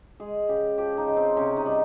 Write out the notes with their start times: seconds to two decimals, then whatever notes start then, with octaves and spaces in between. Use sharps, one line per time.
0.20 G#3 G#4
0.49 C#3 G4
0.78 F3 G4
0.98 D#4
1.07 C#3
1.16 C4
1.37 C3 C#4
1.57 D#4
1.66 G3